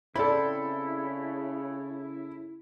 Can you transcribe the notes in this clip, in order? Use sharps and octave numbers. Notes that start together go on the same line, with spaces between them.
C#3 C4 E4 A4 D5 B5